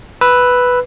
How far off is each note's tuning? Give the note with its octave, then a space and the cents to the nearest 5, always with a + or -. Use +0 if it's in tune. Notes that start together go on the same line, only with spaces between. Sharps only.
B4 +0 E6 +0